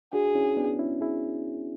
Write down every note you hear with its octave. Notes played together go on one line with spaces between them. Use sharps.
D4 F#4 G#4
C#4 E4
B3 D4
C#4 E4
E4 G#4